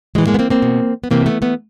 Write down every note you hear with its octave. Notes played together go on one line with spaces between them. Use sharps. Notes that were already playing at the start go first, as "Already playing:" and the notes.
A2 E3 F#3 G#3
G#3 A#3
B3
A#3 C4
A#3 C4
B2
B3
C3 E3 A#3 C4
A3 B3
A3 B3